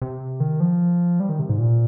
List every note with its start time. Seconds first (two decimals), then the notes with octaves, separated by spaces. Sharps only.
0.02 C3
0.40 D#3
0.60 F3
1.20 G3
1.29 D#3
1.39 C3
1.49 G#2
1.59 A#2